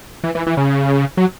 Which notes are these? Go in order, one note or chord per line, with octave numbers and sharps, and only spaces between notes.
E3
E3
E3
C#3
F#3